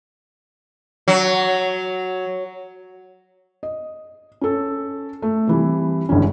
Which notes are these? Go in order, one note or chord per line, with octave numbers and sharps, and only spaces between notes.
F#3
D#5
C#4 A4
A3
C3 E3 G3
G1 C#2 D3 E3 C#4